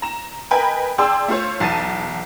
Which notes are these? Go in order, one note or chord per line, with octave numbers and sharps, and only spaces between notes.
A#5 E7
A#4 B4 D#5 G5 G#5 B5
G#4 D5 G5 A5 C6 E6
A3 F4 C5 C#5
B1 E2 A5 A6 D#7